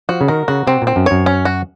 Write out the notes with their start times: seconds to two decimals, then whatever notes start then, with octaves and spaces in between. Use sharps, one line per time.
0.09 F3 F#4
0.21 C#3
0.28 D#3 A#4
0.48 C#3 F#4
0.67 C3 C4
0.82 A#2
0.87 C4
0.96 F#2
1.06 F#2 C#5
1.26 C#4
1.45 F#4